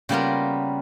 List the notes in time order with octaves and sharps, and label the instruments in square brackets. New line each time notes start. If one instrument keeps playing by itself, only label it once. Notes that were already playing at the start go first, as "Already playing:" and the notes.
[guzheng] C#3 G3 A#3 B3 F4 A#4